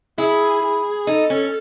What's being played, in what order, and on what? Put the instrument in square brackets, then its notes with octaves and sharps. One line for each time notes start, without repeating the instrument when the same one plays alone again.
[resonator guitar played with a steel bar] E4 [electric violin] G#4
[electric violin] G#4
[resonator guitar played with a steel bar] D#4 [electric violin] A4
[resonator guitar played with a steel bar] C#4